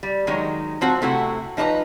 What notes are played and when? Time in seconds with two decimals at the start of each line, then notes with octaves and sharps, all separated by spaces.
0.03 G3
0.27 D#3 F#3 G#3 D#4
0.81 F3 C4 F#4
1.02 C3 A3 E4 F#4
1.57 F3 D#4 B4 C#5 A#5